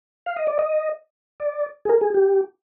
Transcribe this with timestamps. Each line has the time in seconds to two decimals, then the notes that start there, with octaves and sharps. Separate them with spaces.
0.26 F5
0.36 D#5
0.47 D5
0.59 D#5
1.40 D5
1.85 G#4
1.89 A#4
2.01 G#4
2.14 G4